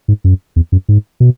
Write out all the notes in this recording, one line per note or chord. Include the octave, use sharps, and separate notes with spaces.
G#2
F#2
E2
F#2
G#2
B2